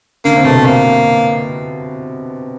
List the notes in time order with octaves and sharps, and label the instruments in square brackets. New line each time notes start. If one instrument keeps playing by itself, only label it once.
[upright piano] D3 [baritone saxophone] A#3
[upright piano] C3
[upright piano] B2 [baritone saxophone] A3
[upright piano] C3
[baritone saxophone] A#3